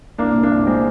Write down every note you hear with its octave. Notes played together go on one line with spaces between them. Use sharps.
C2 A#3 D4
A#2
A#3 D4
C2
G#3 C4